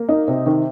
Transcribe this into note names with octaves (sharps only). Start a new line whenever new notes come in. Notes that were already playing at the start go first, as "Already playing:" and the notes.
Already playing: A#3
D#4
C3
D#3